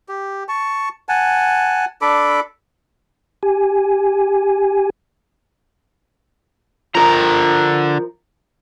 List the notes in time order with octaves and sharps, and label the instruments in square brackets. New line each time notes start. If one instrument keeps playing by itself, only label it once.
[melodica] G4
A5 C#6
F#5 G#5 A5
D4 A4 B5 D6
[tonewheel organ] G4 G#5
[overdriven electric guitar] D3 A#5 [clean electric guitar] F3 A#4